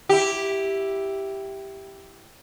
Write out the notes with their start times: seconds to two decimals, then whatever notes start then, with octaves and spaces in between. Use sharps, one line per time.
0.09 E4 G4